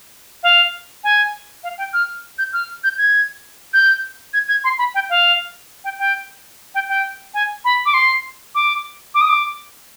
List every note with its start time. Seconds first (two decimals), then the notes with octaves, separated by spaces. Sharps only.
0.43 F5
1.04 G#5
1.64 F5
1.78 G5
1.94 F6
2.38 G6
2.53 F6
2.84 G6
2.98 G#6
3.74 G6
4.34 G#6
4.48 G#6
4.64 C6
4.78 B5
4.95 G5
5.10 F5
5.84 G5
5.99 G5
6.75 G5
6.89 G5
7.34 G#5
7.65 B5
7.86 D6
7.94 C6
8.55 D6
9.15 D6
9.21 D#6
9.29 D6